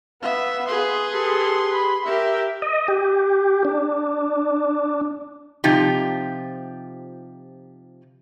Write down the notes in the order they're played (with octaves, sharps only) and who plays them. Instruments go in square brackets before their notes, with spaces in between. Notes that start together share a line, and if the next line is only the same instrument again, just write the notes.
[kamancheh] B3 [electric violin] E5 [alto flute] F5
[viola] G#4 B4 [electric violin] C6
[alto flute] G4 [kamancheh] A4
[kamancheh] B5
[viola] G4 [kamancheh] A#4 E5
[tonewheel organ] D#5
G4
D4
[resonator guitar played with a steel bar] C3 F3 D#4 F4 G4